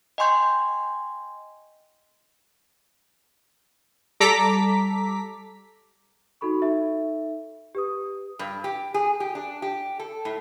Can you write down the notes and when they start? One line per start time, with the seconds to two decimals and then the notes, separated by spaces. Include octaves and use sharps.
0.18 D#5 G5 G#5 C6 C#6 G6
4.20 G3 A4 A#5 D6 B6
6.41 D#4 F#4 A4 B5 C#6
6.62 D#4 A4 E5
7.75 G4 B4 D#6
8.39 G2
8.64 G4
8.94 G#4
9.20 G4
9.35 D4
9.62 G4
9.99 A4
10.25 A2